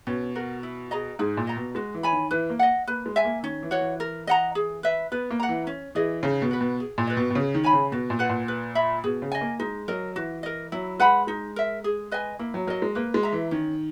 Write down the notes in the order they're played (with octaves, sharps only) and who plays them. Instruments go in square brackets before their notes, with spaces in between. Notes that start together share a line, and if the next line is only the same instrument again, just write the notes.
[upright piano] B2 [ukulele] C#4
[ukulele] F#4 A#4
E4
G#4 D#5 A#5
[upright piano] G#2 [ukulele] G#4
[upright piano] A#2
[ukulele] D#5 A#5
[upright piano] B2
[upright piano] G#3 [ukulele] F#4
[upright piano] E3
[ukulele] C#5 G#5 B5
[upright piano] D#3
[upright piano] E3 [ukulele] B4
[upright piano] A#3
[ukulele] D#5 F#5
[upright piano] A#3 [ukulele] B4
[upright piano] G#3
[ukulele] E5 G#5
[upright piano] A#3
[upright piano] D#3 [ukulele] C#4
[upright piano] E3
[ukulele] F#4 C#5
[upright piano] E3
[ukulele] A#4
D#5 F#5 A#5
G#4
B4 E5
[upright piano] B3 [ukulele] B4
[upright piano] A#3
[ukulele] F#5 A#5
[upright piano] E3
[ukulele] C#4
[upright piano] E3 [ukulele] G#4 D#5
[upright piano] C#3 [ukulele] D#4
[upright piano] B2
[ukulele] F#4 B4
[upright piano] B2
[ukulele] G#4
[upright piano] A#2
[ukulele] B4 D#5
[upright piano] B2
B2
[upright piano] C#3 [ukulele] G#4
[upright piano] D#3
[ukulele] C#5 G#5 B5
[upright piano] C#3
[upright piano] B2 [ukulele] F#4
[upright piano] A#2
[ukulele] B4 F#5
[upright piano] A#2
[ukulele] B4
E5 B5
[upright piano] B2 [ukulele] G#4
[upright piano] C#3
[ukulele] D#5 G#5
[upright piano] A#3
[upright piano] G#3 [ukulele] D#4
[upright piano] F#3 [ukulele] A#4 D#5
[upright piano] E3 [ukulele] F#4
[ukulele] A#4 D#5
[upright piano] F#3 [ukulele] E4
[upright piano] G#3 [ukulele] B4 F#5 B5
[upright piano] G#3 [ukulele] D#4
[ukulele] A#4 E5
G#4
B4 D#5 G#5
[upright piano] A#3 [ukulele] E4
[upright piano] F#3
[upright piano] F#3 [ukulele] A#4 D#5
[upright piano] G#3
[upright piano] A#3 [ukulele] B4
[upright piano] G#3
[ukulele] E5 A#5
[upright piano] E3
[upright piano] D#3 [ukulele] C#4